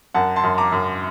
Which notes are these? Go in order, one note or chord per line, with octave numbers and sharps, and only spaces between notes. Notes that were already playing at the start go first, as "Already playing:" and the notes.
F#2 F#5 A5
A5 C6
F#2
A#5 D6
F#2